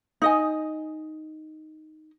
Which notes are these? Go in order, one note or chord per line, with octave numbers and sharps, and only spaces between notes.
D#4 D#5 G#5